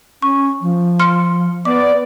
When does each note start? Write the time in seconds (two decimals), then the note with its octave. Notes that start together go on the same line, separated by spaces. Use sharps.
0.22 C#4 C#6
0.61 F3
1.00 C6 F6 C#7
1.65 B3 D5 D6